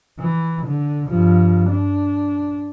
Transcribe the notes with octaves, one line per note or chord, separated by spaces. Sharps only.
E3
D3
G2 F3
D4